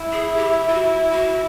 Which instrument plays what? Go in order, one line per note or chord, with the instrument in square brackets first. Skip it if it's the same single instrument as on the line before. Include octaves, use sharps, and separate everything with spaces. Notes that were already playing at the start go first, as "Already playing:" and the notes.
Already playing: [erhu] E4
[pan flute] G#4
G4
F4
F#4
F#4